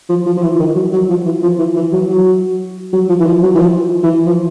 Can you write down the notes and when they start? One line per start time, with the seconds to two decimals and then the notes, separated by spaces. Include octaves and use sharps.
0.09 F3
0.26 F3
0.37 F3
0.43 E3
0.55 E3
0.59 D#3
0.75 F#3
0.92 F#3
1.09 F3
1.26 E3
1.42 F3
1.59 E3
1.75 E3
1.92 F#3
2.09 F#3
2.93 F#3
3.09 F3
3.20 E3
3.26 F3
3.42 F#3
3.55 E3
3.59 F3
4.03 E3
4.26 F3